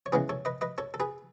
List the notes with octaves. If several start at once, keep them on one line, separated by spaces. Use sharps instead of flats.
C#5
C#3 E3 G#3 B3 G#4 B4
A4 C#5
B4 D#5
B4 D#5
A4 C#5
A4
G#4 B4